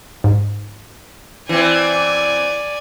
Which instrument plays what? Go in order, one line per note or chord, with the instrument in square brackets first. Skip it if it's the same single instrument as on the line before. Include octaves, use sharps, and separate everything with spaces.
[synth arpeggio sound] G#2
[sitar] E3 C4 [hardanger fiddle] D5 G#5